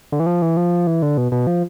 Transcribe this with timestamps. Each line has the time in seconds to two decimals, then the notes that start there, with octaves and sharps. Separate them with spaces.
0.12 D3
0.20 E3
0.26 F3
0.42 E3
0.57 F3
0.87 E3
1.02 D3
1.18 B2
1.32 B2
1.47 F3